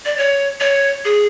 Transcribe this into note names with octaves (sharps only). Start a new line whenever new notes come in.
D5
C#5
C#5
G#4